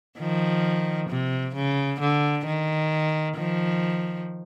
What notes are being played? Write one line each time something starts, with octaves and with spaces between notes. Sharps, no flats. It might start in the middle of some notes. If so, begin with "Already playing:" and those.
D#3 F3
C3
C#3
D3
D#3
D#3 F3